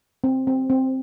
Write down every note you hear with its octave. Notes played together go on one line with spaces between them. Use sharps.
C4
C4
C4